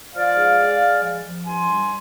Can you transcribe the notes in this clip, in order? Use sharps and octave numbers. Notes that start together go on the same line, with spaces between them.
F3 D5 F5
G#2
G#3
G#3
F3
F3
G2 G#5 C6
G3